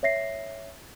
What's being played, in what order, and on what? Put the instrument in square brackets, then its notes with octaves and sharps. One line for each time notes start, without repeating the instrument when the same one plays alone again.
[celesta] C#5 E5 A#6 C7